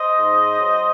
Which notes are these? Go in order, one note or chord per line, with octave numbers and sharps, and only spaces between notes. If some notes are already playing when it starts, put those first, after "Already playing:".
Already playing: C5 D#5
G#2
F#3